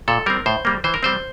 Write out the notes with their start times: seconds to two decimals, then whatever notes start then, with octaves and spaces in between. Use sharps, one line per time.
0.08 A#2 A4
0.26 G3 C4 A#4
0.46 A2 C5
0.65 G3 A#3
0.84 E3 C5
0.94 A#4
1.03 G3 C4 C5